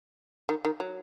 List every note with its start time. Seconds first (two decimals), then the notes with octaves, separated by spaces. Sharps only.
0.49 D#3
0.65 D#3
0.80 F#3